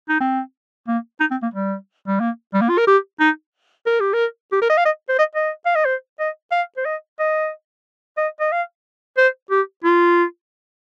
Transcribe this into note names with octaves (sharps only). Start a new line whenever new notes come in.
D#4
C4
A#3
D#4
C4
A#3
G3
G3
A#3
G3
A#3
F4
A#4
G4
D#4
A#4
G4
A#4
G4
A#4
D#5
F5
D#5
C5
D#5
D#5
F5
D#5
C5
D#5
F5
C5
D#5
D#5
D#5
D#5
F5
C5
G4
F4